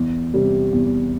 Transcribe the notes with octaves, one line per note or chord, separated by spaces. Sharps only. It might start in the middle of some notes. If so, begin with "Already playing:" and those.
Already playing: E2
C3 G3
E2